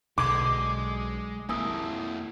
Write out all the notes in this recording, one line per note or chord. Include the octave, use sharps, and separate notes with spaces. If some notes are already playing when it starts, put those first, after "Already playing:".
B1 B2 D3 G#3 D6 G#6
F2 A#3 E4 G#5 D#6 E6